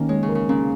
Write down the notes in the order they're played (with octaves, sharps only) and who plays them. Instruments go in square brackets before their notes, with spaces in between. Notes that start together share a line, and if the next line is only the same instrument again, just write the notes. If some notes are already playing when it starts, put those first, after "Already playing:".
Already playing: [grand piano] D#3 C#4 [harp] A#3
[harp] G#3 [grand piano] C#5
[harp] C#3
[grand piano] A#4
[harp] C#3
[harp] A#2 [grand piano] C#4